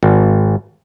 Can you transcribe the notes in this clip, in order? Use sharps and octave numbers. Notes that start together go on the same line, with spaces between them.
G#1